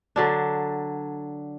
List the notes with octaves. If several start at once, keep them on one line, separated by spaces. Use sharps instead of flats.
D3 F#3 D4